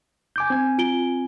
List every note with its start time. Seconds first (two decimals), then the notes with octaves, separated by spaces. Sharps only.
0.36 G#5 D6 G6
0.50 C4 G#5
0.78 F4 D7 G7